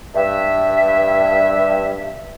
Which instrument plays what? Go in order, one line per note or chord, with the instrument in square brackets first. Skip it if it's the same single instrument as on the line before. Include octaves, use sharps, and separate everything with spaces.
[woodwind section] G2 E5